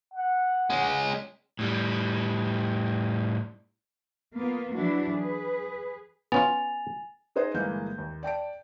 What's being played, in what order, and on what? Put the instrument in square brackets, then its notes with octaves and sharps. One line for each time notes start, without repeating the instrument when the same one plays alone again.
[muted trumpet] F#5
[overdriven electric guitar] G#3 C#4
A2 G3
[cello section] A#3 B3 F4
E3 F#3 D4 E4 F#4
G#4 B4
[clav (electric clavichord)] B3 C#4 F4 [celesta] G#5 A6 F7
[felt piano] D#4 G#4 B4 C5 D#5
G1 E3 G#3 A#3 B4 G6
D#2
D5 G5 A5 D7